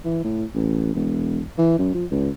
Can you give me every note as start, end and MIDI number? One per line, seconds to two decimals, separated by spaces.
0.05 0.20 52
0.24 0.45 45
0.55 0.90 33
0.95 1.41 28
1.58 1.78 52
1.79 1.91 42
1.94 2.05 53
2.11 2.29 37